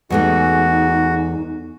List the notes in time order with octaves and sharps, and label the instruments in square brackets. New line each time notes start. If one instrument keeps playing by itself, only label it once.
[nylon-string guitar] E2 G#3 A3 [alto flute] D#4 [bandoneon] F#4